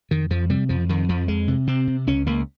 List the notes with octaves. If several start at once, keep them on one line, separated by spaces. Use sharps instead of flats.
F2 D#3
F2 F3
C3 G3
F2 F3
F2 D#3
F2 F3
F2 G#3
C3
C3 C4
C3
C#2 C#4
C#2 A#3